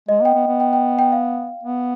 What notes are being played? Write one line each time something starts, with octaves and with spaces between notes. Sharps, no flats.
G#3 D#5
B3 G5
B3
B3
G5
G5
G5
F5
B3